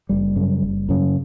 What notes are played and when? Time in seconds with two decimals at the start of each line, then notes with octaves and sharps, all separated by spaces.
0.09 F#1 G3
0.36 F#2 C#3
0.62 F#1
0.89 F#2 C#3